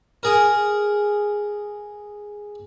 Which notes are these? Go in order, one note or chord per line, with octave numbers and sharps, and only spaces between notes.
G#4 A#4